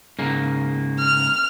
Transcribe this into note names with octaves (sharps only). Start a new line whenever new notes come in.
G#2 C#3 A#3
F6